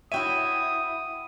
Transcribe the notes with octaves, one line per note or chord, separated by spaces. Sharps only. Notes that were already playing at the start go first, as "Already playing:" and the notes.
E4 F#4 C#5 E5 G5 D#6 D#7